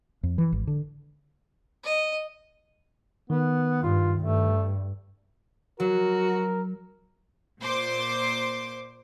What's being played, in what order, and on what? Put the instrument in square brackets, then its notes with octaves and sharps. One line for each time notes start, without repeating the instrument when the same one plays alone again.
[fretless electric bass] F2
E3
G#1
D3
[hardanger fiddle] D#5
[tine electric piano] D#3 [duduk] B3
[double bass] G2 [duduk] F4
[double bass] G2 [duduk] A3
[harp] F#3 [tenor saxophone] F#4 [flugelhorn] A#4
[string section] A#2 C5 C6 D6